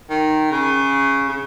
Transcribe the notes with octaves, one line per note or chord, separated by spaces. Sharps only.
D#3
C#3
C#3